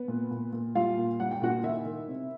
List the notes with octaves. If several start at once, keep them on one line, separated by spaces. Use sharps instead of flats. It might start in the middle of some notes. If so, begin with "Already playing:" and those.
Already playing: B3 B4
A#2
A#2
A#2
G3 F4 F5
A#2
G3 F#5
G5
A#2 F#4 F#5
D#3 E4 E5
D#3
C3